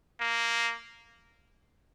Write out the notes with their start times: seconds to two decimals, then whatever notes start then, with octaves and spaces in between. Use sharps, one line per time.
0.20 A#3